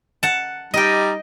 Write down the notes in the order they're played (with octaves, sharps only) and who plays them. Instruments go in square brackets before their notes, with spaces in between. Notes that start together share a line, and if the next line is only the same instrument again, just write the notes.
[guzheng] F#5 A5
[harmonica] G3 D#4 [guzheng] D#5 G5